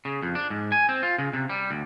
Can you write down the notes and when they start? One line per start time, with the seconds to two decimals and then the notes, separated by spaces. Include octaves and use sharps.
0.05 C#3
0.22 F2
0.35 D4
0.50 G#2
0.72 G#5
0.89 C4
1.03 F4
1.18 C#3
1.33 C3
1.49 G3
1.71 D2